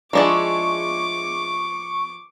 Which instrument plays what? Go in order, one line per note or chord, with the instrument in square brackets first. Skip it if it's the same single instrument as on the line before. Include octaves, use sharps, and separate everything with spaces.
[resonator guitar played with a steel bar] F3 G#4 [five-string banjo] G#3 D4 E4 [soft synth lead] C#6 [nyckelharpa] D6